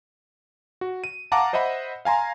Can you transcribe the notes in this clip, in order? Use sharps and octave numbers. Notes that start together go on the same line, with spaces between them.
F#4
D#7
F5 F#5 A5 A#5 D6
C5 D#5 E5 F#5 B5
F5 G#5 A#5 C6